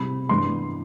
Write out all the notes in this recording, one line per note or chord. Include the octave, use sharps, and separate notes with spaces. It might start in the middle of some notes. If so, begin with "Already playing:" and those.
Already playing: C3 G3 C4 B5
G2 E3 B3 D4 C6